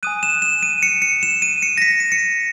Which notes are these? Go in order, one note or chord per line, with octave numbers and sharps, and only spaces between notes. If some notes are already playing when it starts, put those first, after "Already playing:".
G#5 D#6 F#6 D#7
E7
E7
D#7
C#7
C#7
E7
D#7
C#7
A#6
B6
D#7
C#7